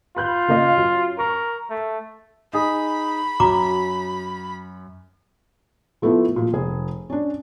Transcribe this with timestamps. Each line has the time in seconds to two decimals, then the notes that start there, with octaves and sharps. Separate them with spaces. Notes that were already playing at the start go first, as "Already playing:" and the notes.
0.17 F4 B5 F#6 G6
0.48 C#3 A#3 D#5
0.77 F#2
1.19 A#4 C#6
1.70 A3
2.53 D#4 G#4 B5
3.40 F#2 F#4 A#5 D6
6.02 F3 A3 B3 E4 F4
6.36 A#2 F3
6.53 F1 G#4
7.10 C#4 D4